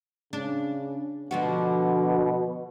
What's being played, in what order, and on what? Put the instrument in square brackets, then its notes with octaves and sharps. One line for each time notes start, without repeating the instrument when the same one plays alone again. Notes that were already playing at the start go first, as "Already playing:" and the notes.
[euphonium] C#3 [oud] D4
[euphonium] B2 [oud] D3 F3 F#4